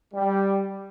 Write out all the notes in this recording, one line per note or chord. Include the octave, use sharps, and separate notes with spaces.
G3